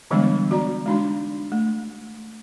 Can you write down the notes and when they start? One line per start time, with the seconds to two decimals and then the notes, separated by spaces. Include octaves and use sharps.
0.11 D3 E3 G3 G#3 B3 D4
0.51 F#4 D5 A#5
0.86 G#3 D4 D#4
1.52 A3